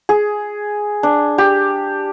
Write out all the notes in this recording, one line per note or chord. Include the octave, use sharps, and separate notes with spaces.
G#4
D4
G4